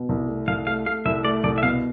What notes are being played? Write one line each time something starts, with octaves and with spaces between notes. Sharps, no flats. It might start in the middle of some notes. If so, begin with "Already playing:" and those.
Already playing: B2
C2
A3
C2 F5
A3 F5
A3 F5
C2 E5
A3 D5
C2 D5
E5
B2 F5